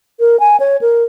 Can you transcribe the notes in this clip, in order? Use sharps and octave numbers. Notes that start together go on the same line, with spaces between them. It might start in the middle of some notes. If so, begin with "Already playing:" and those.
A#4
G#5
C#5
A#4